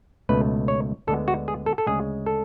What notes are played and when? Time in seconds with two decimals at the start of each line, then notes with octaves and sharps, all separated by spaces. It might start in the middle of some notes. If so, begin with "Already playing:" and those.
0.29 C#2 B2 A3 B4
0.68 C#5
1.07 D2 D3 G#3 B3 A4
1.28 F#4
1.48 G#4
1.66 A4
1.78 A4
1.87 D2 C#3 G#3 G#4
2.26 A4